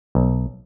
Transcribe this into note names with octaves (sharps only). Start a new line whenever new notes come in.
B1